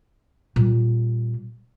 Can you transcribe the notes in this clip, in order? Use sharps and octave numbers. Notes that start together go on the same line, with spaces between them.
A#2 G3